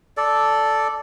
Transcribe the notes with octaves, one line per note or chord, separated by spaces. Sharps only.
A4 D5